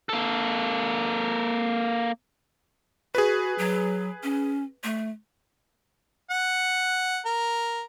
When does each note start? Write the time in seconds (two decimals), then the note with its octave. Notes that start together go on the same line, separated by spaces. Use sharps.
0.09 A#3 A4
3.15 F#4 G#4 B4
3.58 F#3
4.23 C#4
4.84 A3
6.30 F#5
7.26 A#4